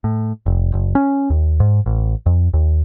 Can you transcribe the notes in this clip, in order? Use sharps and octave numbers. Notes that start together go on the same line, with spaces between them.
A2
F1
F#1
C#4
D#2
G#2
A1
F2
D#2